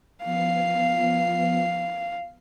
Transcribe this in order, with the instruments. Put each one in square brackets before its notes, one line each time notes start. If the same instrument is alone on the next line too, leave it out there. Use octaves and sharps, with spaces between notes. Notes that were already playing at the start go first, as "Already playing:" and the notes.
[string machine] F3 B3 C7 [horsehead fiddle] F5